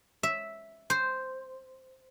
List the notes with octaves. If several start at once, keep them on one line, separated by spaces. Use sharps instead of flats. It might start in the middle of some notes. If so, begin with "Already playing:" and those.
E5
C5